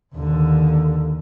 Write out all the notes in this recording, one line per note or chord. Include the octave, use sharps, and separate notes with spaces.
D#2 D3